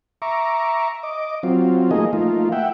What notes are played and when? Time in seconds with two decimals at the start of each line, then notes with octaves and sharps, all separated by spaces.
0.22 E5 A#5 C#6 D6
1.03 D#5 D6
1.43 F#3 C4 F4
1.91 F3 A3 A#3 D#4 G#4 D#5
2.13 F3 A3 A#3 D#4 F4
2.52 E5 F#5 G5